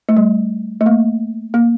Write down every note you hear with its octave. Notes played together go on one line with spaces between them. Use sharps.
A3
G3
A3
A#3
A#3